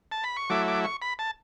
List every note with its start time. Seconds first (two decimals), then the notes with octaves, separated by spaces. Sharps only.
0.12 A5
0.24 B5
0.37 C#6
0.50 F#3 A3 E4 D6
0.68 D6
0.84 C#6
1.02 B5
1.19 A5